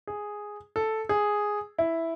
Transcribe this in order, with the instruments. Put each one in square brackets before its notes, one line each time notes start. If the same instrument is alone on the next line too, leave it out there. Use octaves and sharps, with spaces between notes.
[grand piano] G#4
A4
G#4
E4